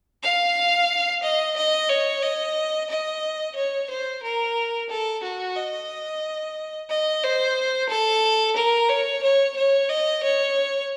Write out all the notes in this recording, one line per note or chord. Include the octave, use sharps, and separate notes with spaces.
F5
D#5
D#5
C#5
D#5
D#5
C#5
C5
A#4
A4
F#4
D#5
D#5
C5
A4
A#4
C#5
C#5
C#5
D#5
C#5